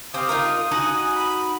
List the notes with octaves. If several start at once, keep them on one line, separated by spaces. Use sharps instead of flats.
C4 G4 F5 D#6
D#4 F4 A#4
D#4 F#4 F#5 G#5
B5